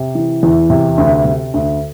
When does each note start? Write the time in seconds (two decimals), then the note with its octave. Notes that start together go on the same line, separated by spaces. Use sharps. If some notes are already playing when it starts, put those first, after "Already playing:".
Already playing: C3
0.15 E3
0.43 E2
0.70 C3
0.98 D2
1.25 C3
1.54 D2